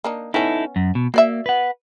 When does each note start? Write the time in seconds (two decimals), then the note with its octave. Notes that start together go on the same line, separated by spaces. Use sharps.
0.04 A#3 D4 D#4
0.34 B3 C#4 D#4 E4 A4
0.76 F#2
0.95 B2
1.14 A#3 F#4 D5 E5
1.46 B4 F#5